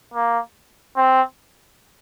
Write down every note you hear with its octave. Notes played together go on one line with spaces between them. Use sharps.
A#3
C4